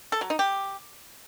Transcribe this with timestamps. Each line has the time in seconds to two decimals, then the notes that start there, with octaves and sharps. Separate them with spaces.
0.12 A4
0.21 F#3
0.30 D#4
0.39 G4